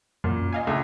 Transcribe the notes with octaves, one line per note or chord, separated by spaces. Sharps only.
F#2 A#2
D#5 F5 G#5
C#2 A3